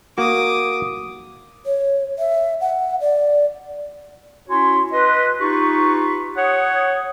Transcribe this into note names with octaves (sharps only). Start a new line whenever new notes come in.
A#3 F#4 D6 D#6
C#5
E5
F#5
D5
C#4 E4 F#4 C#5 G#5 C6
B4 D#5 C6
D#4 F4 G4 B4 C#6
C#5 F#5 D#6